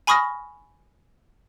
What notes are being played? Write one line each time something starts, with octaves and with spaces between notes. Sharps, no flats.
G#5 B5 C#6 D#6 F6 A#6